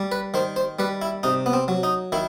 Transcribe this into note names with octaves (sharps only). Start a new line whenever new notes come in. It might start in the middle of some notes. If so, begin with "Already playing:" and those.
Already playing: G3
B4
D#3 C5
C5
G3 B4
E4
C3 D#4
B3
C4
F#3
D#4
D#3 E4